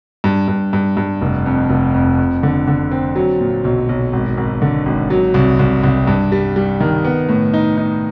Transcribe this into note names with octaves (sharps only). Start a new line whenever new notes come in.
G2
G2
G2
G2
F1
F2
F1
F2
F2
D3
D3
C4
F#3
A#2
B1
B1
G#1
G#1
D3
G#1
F#3
C2
C2
C2
G2
G3
G3
D#3
B3
A2
D#4
D#4